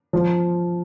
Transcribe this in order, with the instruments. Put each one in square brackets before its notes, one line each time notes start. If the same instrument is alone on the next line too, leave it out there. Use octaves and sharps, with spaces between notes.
[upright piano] F3